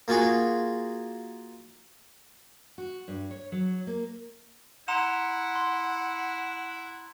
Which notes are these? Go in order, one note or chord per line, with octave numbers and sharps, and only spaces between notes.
A#3 F4 F#4 G#4
F#4
G2
C#5
F#3
A#3
E4 F#5 A#5 C6 E7
C6